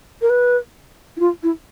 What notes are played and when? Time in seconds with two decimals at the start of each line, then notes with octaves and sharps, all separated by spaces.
0.22 A#4
0.30 B4
1.17 E4
1.20 F4
1.43 E4